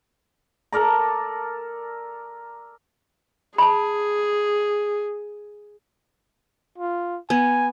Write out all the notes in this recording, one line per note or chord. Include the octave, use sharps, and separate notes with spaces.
A4 A#4 D5 A#5
G#4 A5 B5
F4
B3 G#5